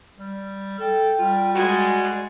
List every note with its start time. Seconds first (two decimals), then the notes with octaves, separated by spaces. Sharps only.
0.18 G3
0.79 A4 G5
1.19 G3 F4
1.55 G#3 F#4 D5 G#5